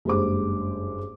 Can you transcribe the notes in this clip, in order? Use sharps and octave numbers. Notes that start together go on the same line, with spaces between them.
F#1 G2 G#3 C5 D6